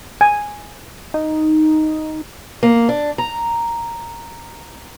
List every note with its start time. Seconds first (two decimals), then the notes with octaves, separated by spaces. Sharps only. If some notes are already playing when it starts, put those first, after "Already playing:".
0.21 G#5
1.14 D#4
2.63 A#3
2.89 D4
3.18 A#5